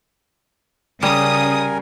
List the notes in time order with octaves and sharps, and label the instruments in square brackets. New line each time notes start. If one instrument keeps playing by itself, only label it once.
[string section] C#3 [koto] G3 [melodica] A#4 G#5 [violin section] D#6